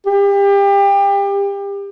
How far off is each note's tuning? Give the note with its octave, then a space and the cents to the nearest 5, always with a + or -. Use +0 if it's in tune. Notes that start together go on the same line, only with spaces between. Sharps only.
G4 +30